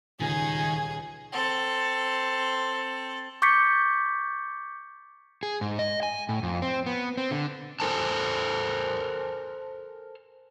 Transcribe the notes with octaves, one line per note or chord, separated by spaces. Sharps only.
D#1 C#2 D#3 G#4 G#5
C4 A4
C#6 D6 G6 A6 B6 C#7
G#4
G#2
D#5
G#5
A2
F2
C4
B3
C4
D3
A4 A#4 C5 G#5 A5